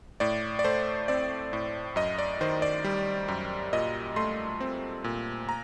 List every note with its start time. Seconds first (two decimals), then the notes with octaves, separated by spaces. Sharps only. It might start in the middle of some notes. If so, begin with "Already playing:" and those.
0.20 A2 D5
0.59 D5
0.64 A3 C5
1.08 C4 D5
1.53 A2
1.96 F#2 D#5
2.18 D5
2.41 D#3 C5
2.62 D5
2.84 G3
3.28 F#2
3.73 A#2 D#5
4.16 A3 C6
4.60 C4
5.04 A#2
5.49 A#5